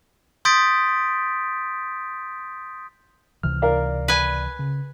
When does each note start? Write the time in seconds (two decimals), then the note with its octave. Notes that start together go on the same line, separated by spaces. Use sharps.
0.45 C6 D#6 G6 A6 B6 D7
3.43 C#2 C3 E3 F6
3.62 A#4 D5 F5
4.08 B4 G#5
4.59 C#3